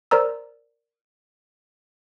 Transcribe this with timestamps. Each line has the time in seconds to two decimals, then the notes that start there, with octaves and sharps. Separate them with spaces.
0.11 A#4 C5 D5 A#5 E6